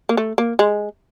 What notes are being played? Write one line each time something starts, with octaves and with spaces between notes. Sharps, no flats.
A#3
A3
A#3
G#3